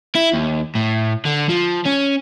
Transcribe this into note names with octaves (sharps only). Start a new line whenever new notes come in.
E4
D#2
A2
D3
F3
C#4